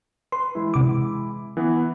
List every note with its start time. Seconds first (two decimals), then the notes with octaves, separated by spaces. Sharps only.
0.32 B4 C6
0.55 E3 G#3 E4
0.74 C3 D6
1.57 E3 B3